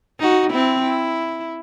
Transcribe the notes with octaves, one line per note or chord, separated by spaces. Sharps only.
D#4 F#4
C4 E4
E4